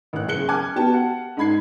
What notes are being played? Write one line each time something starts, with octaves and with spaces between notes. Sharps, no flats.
A1 F#6
F#1 G#4 F#6 C#7 G7
G#5 D6 F6 F#6 G#6
B3 F#4 G4 G5 A5
F#5 A5
G#2 D#4 B5 G#6 C7